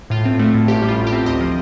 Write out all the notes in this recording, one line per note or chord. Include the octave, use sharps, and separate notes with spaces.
A2 F4
C4
A3
A2
A1 G4
G3
F4
A2
G4
C4
D2 D#5
F3